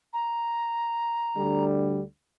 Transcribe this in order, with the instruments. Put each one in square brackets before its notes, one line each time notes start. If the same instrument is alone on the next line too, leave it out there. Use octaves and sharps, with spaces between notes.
[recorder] A#5
[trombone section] D2 D3 G3